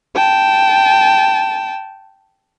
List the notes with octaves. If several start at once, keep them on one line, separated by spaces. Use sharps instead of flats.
G5 A5